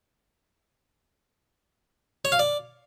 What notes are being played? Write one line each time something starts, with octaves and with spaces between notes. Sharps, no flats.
C#5
F5
D5